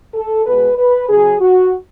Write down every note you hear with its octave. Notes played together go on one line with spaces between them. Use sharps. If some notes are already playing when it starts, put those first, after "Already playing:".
A4
B2 G#3 B4
B4
C#3 F#3 G#4
F#4